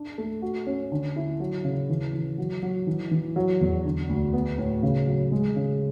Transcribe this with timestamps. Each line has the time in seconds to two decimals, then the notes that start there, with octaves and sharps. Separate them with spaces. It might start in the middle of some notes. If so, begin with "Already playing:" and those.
Already playing: D4
0.18 A3
0.42 F#4
0.67 C#4
0.92 D3
1.16 E4
1.40 F#3
1.64 C#3
1.89 E3
2.14 E3
2.38 F#3
2.63 F#3
2.87 E3
3.11 E3
3.36 F#3
3.61 E2
3.85 D3
4.09 D2
4.33 B3
4.58 A2
4.83 C#3
5.07 F#3
5.32 G#3
5.56 C#3